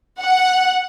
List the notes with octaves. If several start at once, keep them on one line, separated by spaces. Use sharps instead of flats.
F#5